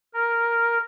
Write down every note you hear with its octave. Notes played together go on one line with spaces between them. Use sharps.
A#4